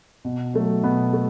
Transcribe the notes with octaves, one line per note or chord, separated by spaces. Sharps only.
B2
F#3 A3
B2 B3
A3